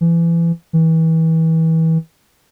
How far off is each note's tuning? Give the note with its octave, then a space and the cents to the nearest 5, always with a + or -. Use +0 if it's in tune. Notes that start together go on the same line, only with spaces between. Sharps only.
E3 +30
E3 -30